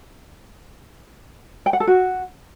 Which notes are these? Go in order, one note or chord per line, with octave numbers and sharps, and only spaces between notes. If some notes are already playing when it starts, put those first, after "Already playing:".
G5
F#5
A4
F#4